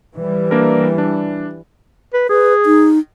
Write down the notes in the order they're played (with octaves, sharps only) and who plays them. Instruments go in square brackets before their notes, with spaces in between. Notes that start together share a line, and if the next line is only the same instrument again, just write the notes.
[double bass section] E3 G3
[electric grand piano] A#3 D4 A#4
D4
[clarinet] B4
[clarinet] G#4 [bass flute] B4
[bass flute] D#4